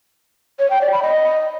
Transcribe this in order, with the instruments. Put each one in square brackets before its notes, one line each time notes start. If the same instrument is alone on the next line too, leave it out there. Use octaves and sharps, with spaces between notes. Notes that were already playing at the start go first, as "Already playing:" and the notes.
[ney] C#5
G5
D5
B5
D#5